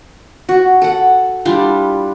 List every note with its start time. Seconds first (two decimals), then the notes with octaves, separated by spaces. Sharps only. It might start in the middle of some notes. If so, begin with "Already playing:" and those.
0.49 F#4
0.82 A4 F#5
1.45 G3 D4 E4 F4